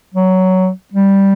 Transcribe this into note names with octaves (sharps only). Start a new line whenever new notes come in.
F#3
G3